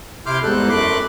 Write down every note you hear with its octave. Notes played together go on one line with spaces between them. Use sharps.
C3 E4 C6 D6 F6 G6
E2 G#2 G3 A4 F#6
F#2 A3 B5 C6 D6 F#6